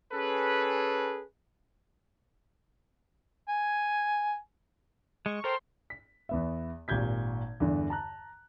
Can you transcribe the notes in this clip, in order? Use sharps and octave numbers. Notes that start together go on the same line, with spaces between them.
C#4 G#4 A4 B4
G#5
G#3 C#6
A4 A#4 C5 G5 C6
B6
E2 B3 E5
G#1 A#2 G4 G6 G#6 B6
E2 G2 D3 E3
A5 A#5 F#6